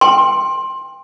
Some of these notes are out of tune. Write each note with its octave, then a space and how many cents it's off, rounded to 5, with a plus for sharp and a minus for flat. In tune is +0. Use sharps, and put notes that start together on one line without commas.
G5 +25 C6 +15